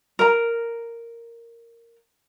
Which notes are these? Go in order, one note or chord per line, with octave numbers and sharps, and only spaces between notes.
A#4 A#5